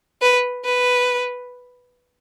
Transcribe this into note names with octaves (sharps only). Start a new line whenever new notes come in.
B4
B4